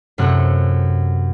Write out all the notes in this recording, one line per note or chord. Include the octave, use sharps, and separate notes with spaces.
F#2 C3 A3 F#5 F#6